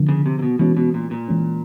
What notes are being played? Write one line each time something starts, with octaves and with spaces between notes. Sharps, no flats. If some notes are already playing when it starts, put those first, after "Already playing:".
Already playing: D3 F3 A#3
C#3
C3
C3
B2
B2 E3 G#3 C#4
B2
A#2
A#2
E3 G#3 C#4